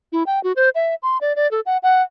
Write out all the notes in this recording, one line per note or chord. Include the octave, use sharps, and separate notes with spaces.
E4
G5
F#4
C5
E5
C6
D5
D5
A4
F#5
F#5